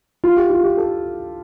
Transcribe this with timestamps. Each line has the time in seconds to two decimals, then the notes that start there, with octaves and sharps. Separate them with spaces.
0.24 F4
0.37 G4
0.50 F4
0.64 G4
0.77 A4